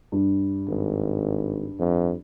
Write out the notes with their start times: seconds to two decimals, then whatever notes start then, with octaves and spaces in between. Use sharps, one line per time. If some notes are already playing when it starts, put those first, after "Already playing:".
0.12 G2
0.69 G#1
1.79 F2